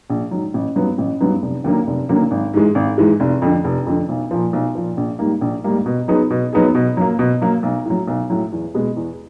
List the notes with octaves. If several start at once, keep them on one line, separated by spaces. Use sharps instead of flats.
A#1
G#2 D#3 F#3
A1
G2 D#3 F#3 B3
A1
G2 D#3 F#3 B3
F1
D#2 D3 F#3 A#3
F1
D#2 D3 F#3 A#3
G#1
G#2 E3 G#3
G#1
G#2 E3 G#3
F1
F2 D3
F1
F2 D3
B1
A#2 F3
B1
A#2 F3
A#1
G#2 D#3 G3 A#3
A#1
G#2 D#3 G3 A#3
B2
F#3 B3 D#4 G#4
B2
F#3 B3 D#4 G#4
B2
F#3 A#3
B2
F#3 A#3
B1
A2 F#3
B1
A2 F#3
E2
B2 G#3 B3
E2